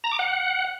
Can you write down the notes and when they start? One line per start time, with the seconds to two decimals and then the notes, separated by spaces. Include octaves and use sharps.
0.04 A#5
0.11 D6
0.19 F#5